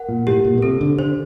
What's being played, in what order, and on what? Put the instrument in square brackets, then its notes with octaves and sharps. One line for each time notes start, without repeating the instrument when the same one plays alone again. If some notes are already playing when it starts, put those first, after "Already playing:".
Already playing: [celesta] A#4 F#5
[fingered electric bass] A#2
[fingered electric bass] A2 [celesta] G4
[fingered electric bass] A#2
A#2
[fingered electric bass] C3 [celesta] A4
[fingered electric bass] D3
[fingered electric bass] D3 [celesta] C5